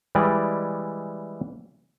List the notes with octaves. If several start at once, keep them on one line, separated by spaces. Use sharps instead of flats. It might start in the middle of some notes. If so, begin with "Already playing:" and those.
E3 G3 G#3 D5 D#5